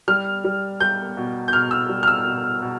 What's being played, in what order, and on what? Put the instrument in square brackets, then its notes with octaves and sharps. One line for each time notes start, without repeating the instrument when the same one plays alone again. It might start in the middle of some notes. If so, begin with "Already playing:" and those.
[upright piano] G3 F6
G3
G3 G6
B2
G6
B2 F6
E6
G3
F6
E6
B2
B2